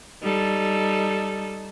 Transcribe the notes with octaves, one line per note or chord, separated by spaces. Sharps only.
G3 D#4 A4